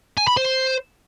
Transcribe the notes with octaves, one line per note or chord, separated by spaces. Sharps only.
G#5
B5
C5